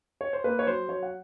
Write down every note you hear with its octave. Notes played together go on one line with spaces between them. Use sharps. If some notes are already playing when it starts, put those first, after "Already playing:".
C#5
C5
A#3 B4
C#5
F#3 C5
F#3 C#5
F#5